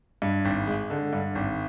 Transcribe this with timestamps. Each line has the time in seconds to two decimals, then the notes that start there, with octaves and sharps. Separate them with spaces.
0.22 G2
0.45 G#1
0.67 G#3
0.90 D3
1.13 G2
1.35 G#1